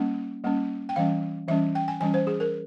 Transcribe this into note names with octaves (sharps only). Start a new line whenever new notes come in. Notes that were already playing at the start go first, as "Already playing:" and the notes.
Already playing: G3 A#3 C#4
G3 A#3 C#4
G5
E3 G3 C#4 F5
E3 G3 C#4 E5
G5
G#5
E3 G3 C#4 G#5
C5
G#4
A#4